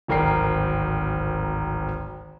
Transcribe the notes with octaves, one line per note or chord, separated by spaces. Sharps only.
D1 G#1 A#4 G5 C7